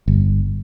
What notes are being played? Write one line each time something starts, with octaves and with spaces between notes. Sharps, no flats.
G1